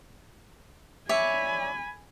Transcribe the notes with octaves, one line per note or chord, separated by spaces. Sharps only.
C#5 D5 E5 G#5 B5